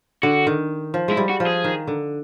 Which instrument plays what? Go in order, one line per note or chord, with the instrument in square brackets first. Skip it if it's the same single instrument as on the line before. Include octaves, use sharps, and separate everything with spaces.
[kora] D3 [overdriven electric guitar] F#4
[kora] D#3
F3
[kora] G#3 [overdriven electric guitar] E4
[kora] G3
[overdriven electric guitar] F#4
[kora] F3
[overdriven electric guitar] G#4
[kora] D#3
D3